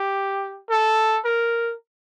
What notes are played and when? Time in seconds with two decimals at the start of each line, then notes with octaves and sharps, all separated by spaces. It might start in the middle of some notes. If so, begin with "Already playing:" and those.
Already playing: G4
0.70 A4
1.25 A#4